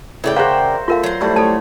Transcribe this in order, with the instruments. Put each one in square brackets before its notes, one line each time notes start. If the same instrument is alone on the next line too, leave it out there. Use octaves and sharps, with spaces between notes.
[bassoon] A2 [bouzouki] C#3 D5 G5 [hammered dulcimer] E5
[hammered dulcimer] F#4 C5 [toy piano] G#4 C#5 F5 [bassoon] A#4
[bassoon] A3 [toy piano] F4 A#4 F5
[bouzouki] F#3 C5
[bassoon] G3 [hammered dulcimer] A3 E4
[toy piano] A4 A5 [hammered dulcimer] C#5